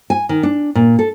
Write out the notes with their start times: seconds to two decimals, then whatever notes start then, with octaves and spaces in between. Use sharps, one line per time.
0.10 G#5
0.29 D#3
0.43 D4
0.75 A#2
0.99 A4